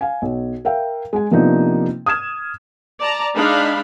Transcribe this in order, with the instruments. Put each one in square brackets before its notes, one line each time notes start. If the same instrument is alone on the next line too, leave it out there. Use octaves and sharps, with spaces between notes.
[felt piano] F5 G#5
B1
A#4 E5 F5 G5
G#3 G#5
C3 F3 A#3 B3 D4 D#4
D#6 F6 G#6 E7
[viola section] D5 A5 A#5
G#3 D4 D#4 F5 B5